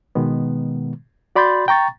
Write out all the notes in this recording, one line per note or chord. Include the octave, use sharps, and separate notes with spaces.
B2 D#3 G#3 B3
F#4 D5 B5 C6 G6 A6
G5 A#5 C#6 A6